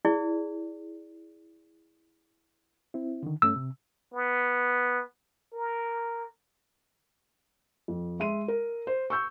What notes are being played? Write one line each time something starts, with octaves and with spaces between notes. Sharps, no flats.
E4 G#4 D5
C4 E4
D3 D#3
G2 A3 C#4 E6
C3
B3
A#4
F2
G#3 E5 C6 D#7
A#4
C5
C#6 E6 G6